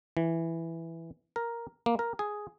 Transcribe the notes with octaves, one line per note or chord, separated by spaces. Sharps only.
E3
A#4
A#3
A#4
G#4